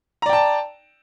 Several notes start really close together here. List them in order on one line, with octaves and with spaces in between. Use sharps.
A#5 D5 G5 A5